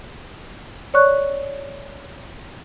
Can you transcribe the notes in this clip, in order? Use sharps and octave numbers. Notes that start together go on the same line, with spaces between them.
C#5 D5 C#6 F#6